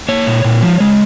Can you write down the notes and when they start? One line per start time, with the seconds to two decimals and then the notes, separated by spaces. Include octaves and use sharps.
0.09 A#3 C#5
0.27 A#2
0.44 A#2
0.62 F3
0.80 G#3